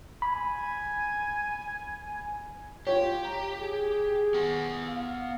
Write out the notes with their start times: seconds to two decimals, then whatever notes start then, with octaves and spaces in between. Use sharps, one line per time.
0.22 G#5 B5
2.87 F4 G4 C#5
3.25 A#5
3.60 G#4
4.34 B3 G#5
4.88 F5